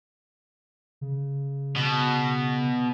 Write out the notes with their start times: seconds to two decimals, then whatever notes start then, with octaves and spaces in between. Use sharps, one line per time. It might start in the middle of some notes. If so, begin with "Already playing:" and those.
1.01 C#3
1.76 B2